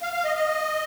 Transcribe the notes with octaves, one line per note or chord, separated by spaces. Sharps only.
F5
F5
D#5
D#5